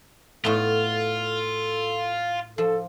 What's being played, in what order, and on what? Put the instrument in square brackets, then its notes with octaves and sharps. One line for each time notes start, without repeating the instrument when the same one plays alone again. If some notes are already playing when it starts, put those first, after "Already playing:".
[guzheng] A2 A3 B3 [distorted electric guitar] F4 [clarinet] A4
[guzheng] F3 [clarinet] A4